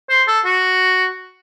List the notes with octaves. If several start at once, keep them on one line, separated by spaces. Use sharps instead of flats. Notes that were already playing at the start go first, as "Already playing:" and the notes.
C5
A4
F#4